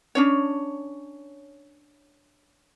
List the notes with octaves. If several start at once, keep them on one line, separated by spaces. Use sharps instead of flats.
C#4 D4 C#5